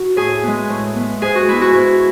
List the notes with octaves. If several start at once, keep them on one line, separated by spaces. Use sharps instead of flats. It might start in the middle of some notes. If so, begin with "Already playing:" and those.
Already playing: F#4
A2 G#4
G#3 B3
A2
G#3 B3
G#2 G#4
F#4
G#3 B3 E4
F#4
G#2